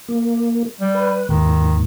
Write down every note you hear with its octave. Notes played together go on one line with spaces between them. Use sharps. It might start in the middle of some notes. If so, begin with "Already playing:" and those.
A#3
G3
B4
D#2 G#2 D#3